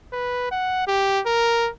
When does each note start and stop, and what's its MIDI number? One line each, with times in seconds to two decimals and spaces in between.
0.13 0.49 71
0.51 0.82 78
0.87 1.21 67
1.26 1.69 70